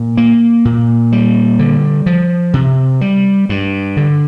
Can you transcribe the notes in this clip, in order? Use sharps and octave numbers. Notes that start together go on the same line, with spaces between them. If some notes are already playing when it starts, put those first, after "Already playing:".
Already playing: A#2
A#3
A#2
G3
D3
F3
C3
G3
G2
D3